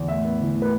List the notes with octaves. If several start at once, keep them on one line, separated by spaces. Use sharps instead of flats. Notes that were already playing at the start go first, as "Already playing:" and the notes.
Already playing: E2
A2 E5
B3
E3
A2
B4